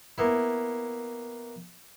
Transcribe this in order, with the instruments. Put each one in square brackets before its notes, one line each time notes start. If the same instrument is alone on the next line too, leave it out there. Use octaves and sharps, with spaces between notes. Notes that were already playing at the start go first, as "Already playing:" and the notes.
[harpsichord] A#3 B3 E4